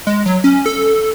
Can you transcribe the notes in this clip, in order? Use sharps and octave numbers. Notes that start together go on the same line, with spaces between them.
G#3
F#3
C#4
A4